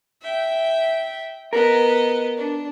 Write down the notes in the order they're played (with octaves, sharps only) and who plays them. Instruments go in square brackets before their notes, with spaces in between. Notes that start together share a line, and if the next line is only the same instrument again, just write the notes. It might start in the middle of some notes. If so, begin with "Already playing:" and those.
[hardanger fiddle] E5 G5
[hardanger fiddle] B3 D#5 [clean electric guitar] A#4
[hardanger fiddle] D4